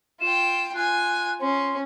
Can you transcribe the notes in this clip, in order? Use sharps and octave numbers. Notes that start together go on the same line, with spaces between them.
F4 G5 E7
F4 G#5 F#6
C#4 C6